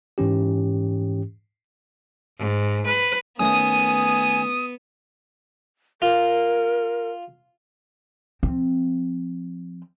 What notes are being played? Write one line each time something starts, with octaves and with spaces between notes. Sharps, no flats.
G#2 E3 C#4 G4
G#2
B4
D#3 A3 B3 C#4 G#5 D#6
F4 A#4
F3 C4